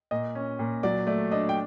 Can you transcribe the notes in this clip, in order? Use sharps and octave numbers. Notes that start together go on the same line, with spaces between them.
A#2 D#5
C#4
A#2
F#3 D5
A3 D5
D4 D#5
G5